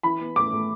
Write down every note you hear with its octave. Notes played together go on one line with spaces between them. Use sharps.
E3 B5
B3
A2 D6
A2